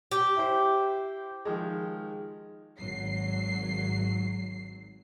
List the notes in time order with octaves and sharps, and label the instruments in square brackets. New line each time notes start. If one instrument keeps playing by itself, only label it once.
[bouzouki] G4
[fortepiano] E4 C5
D#3 F3 G#3
[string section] G#1 F#3 C7